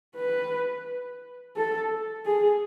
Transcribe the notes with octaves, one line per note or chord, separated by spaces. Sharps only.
B4
A4
G#4